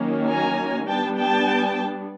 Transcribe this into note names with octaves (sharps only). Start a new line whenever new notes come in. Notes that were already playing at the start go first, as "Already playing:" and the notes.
Already playing: D#3 F#3 A#3 C#4
G#5 A#5
G3 B3 D4 G5 A5
G5 A5